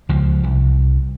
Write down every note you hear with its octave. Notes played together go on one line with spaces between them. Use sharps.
C#2 F3
C2